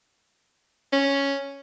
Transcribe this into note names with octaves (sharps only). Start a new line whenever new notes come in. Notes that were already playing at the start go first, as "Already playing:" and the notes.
C#4